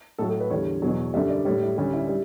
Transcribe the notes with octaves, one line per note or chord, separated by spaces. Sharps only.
A2 F#3 A4
A4
B4
E2 D3 G3 C#5
E2 B2 F#3
F#2 D3 G3 E5
D5
A2 G3 C#5
E4
D2 D3 G3 C#4
E4
G3